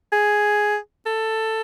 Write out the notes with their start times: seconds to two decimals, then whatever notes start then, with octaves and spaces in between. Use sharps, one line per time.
0.12 G#4
1.06 A4